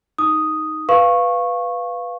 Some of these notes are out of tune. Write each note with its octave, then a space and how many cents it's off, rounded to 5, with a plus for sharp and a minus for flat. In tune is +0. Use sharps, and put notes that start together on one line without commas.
D#4 +0 D#6 +0
B4 +0 F5 +0 C#6 -15